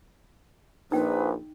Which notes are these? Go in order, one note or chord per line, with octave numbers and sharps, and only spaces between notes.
A#1 D#4 B4 G5